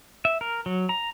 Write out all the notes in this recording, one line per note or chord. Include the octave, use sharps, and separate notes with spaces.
E5
A#4
F#3
A#5